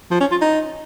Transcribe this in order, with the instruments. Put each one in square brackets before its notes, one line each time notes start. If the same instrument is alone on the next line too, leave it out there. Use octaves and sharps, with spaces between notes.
[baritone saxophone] F3
C#4
F4
D#4